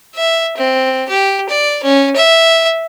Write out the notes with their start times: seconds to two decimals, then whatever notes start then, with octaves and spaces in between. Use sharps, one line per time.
0.15 E5
0.57 C4
1.09 G4
1.49 D5
1.83 C#4
2.16 E5